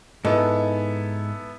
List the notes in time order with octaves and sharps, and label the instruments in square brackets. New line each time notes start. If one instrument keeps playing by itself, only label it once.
[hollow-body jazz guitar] G#2 [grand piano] B3 E4 A4